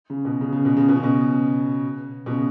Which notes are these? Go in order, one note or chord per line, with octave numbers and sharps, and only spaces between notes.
C#3
B2
C#3
C#3
B2
C#3
B2
C#3
B2
B2
C#3